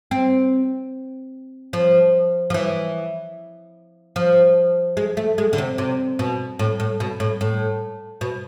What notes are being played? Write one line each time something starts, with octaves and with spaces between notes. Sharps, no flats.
C4
F3
F3
E3
F3
G#3
A3
G#3
D3
C3
C3
B2
A2
A2
B2
A2
A2
B2